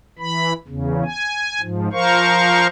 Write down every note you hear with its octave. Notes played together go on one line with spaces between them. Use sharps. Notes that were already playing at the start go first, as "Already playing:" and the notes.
E3 B5
E2 C#3
G#5
G#2 F3
F3 A#4 C5 F5 C#6